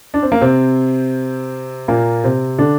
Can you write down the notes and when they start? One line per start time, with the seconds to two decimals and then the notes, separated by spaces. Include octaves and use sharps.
0.14 D4
0.23 C4
0.32 A#3
0.41 C3 C4
1.88 A#2 A#3
2.24 C3 C4
2.58 D3 D4